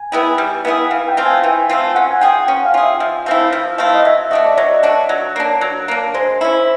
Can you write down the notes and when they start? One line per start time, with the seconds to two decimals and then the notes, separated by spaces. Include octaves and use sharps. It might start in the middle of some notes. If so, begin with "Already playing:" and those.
Already playing: G#5
0.12 B3 E4 G#4 G5
0.38 G3
0.65 B3 E4 G#4 F#5
0.91 E3 F5
1.08 G5
1.17 A3 C4 F4
1.25 G#5
1.44 E3 G5
1.69 A3 C4 F4
1.95 C#4 F#5
2.11 G#5
2.21 F4 G#4 G5
2.48 C#4
2.65 F5
2.74 F4 G#4
2.83 E5
3.00 F3 E5
3.26 A3 C4 E4 F5
3.52 F3 F5
3.78 A3 C4 E4 F5
3.94 D#5
4.05 F#3 E5
4.31 A3 D4 F#4 D#5
4.46 D5
4.58 F#3 C#5
4.83 A3 D4 F#4
5.09 F#3
5.36 A#3 D4
5.61 F#3
5.88 A#3 D4
6.14 G#3 C5
6.41 C#4 E4